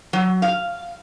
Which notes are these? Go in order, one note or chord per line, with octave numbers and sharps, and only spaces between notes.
F#3
F5